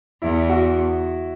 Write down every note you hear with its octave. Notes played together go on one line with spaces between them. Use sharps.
E2 E4
F#4